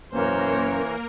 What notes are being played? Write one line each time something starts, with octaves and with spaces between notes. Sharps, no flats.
F#2 B2 E3 A#3 C#4 A#4 C5 C#5